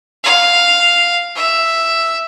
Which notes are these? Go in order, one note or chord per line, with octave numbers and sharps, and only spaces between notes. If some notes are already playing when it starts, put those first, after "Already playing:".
F5
E5